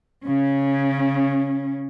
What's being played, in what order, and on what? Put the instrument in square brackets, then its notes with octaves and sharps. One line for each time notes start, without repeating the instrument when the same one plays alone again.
[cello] C#3 C#4